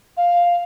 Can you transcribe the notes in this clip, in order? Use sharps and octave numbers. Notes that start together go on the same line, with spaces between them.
F5